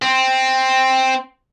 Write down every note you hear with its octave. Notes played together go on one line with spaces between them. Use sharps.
C4